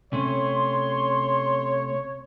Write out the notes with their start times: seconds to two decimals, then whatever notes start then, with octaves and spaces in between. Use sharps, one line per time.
0.13 C3 A3 C#4 C#5 C6